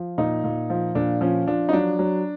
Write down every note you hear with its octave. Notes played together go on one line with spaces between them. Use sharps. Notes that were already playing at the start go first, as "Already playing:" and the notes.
Already playing: F3
A#2 D#4
A#2
F3
A#2 D4
F3 C#4
F3 D4
D#4
F#3 D4
F#3